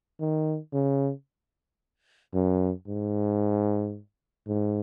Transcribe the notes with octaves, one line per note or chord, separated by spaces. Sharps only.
D#3
C#3
F#2
G#2
G#2